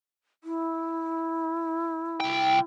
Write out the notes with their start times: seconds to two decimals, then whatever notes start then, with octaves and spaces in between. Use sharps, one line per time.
0.44 E4
2.20 C2 G5